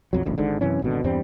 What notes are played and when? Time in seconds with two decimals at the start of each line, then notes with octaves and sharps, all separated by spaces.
0.13 B1 F2 F#3
0.26 D#1 A1 D2
0.38 G#1 G#2 D3
0.61 F#2 C3 E3 C#4
0.82 G#1 B2 D3
1.04 E2 G2 G3 C4